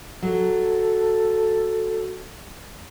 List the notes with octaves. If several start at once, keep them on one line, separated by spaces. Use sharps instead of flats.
F#3 A4